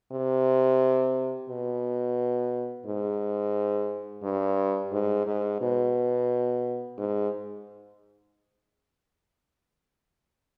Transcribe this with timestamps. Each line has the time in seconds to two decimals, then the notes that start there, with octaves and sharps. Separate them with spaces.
0.12 C3
1.50 B2
2.86 G#2
4.23 G2
4.92 G#2
5.27 G#2
5.61 B2
6.98 G#2